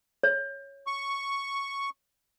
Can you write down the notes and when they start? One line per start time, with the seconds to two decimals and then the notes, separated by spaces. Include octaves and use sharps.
0.23 C#5
0.87 C#6